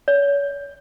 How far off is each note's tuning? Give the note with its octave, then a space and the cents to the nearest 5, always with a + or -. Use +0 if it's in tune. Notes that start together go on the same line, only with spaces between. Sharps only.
C#5 +35